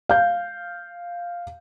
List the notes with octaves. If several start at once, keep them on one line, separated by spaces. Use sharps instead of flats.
F5 G6